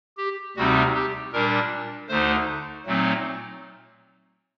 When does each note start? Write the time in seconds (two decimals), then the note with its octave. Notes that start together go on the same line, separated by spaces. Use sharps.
0.17 G4
0.56 D2 C3 G3 C4 D#4 F#4
0.94 G4
1.32 A#2 G3 D4 A#4
2.09 D2 D3 A3 D#4 C5
2.86 A#2 F#3 A3 C4 D#4